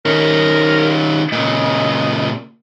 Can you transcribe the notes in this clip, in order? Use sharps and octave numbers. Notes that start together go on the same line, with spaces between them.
D#3 C#4 A#4
A#2 C#3 D#5